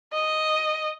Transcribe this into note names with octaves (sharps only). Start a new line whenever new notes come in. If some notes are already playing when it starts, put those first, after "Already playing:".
D#5